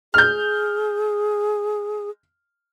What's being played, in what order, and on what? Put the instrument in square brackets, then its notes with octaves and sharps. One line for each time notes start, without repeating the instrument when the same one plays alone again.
[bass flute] G#4 [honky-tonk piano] F6 G6